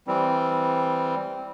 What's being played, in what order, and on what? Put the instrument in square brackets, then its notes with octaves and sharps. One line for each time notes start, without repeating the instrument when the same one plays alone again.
[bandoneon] E3 G3 C4